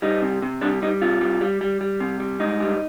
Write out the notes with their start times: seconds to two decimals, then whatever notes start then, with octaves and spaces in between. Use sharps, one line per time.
0.02 G3 D#4
0.22 C3
0.42 C3
0.61 G3 D4
0.82 G3 D#4
1.02 C3 F4
1.21 G3
1.41 G3
1.61 G3
1.81 G3
2.00 C3
2.20 G3
2.40 G#2 D#4
2.60 G3